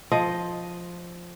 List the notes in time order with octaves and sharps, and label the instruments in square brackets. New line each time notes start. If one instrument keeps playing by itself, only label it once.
[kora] F3 D#5